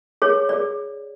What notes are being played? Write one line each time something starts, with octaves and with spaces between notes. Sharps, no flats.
G#4 C#5
G#4 D5